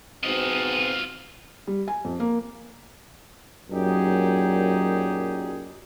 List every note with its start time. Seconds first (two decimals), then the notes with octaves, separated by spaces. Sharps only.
0.23 G#2 B2 C4 F4 D#5
1.67 G3
1.88 G#5
2.04 F2
2.20 A#3
3.71 F#2 A#2 F#3 D#4 G4 G#4